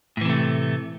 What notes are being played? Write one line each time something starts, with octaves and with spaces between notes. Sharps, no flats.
A2 C3 E3 A3